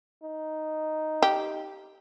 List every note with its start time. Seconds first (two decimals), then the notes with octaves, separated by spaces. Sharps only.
0.23 D#4
1.22 G4